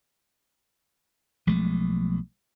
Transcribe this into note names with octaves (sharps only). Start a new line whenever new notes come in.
B1 F3 G#3 A3